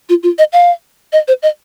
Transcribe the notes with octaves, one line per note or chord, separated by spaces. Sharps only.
F4
F4
D#5
F5
D#5
C5
D#5